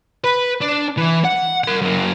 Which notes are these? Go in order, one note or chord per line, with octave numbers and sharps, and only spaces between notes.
B4
D4
E3
F#5
A#4 F#5
F#2 A#3